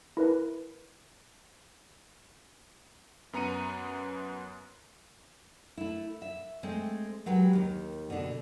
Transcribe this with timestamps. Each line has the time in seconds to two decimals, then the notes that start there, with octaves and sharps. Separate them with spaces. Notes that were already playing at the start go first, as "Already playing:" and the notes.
0.17 E4 A#4 B4
3.33 F#2 B3 A#5 C#7 D#7
5.77 A3 E4
6.22 E5
6.63 G#3 A3 C4
7.26 F#3 G#3 G4 B4
7.53 D#2 D#3
8.10 B2 D3